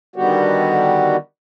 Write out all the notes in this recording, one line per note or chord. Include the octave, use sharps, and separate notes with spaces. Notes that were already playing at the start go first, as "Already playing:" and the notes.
D3 D#3 G3 B3 F#4 G4